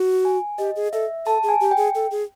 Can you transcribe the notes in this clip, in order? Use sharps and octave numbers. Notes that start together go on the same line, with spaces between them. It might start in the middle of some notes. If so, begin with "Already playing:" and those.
Already playing: F#4
G#5
G4 D#5
G#4
A4 E5
A4 A5
G#4
G#5
G4
G5
G#4
A4
G#4